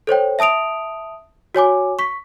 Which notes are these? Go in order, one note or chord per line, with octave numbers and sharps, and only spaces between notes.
A4 C5 C#5 G5
E5 A5 D#6 D7 F7
F#4 C#5 G#5 D6
C#6 B6